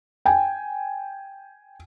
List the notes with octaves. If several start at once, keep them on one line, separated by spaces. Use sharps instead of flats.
G5 G#5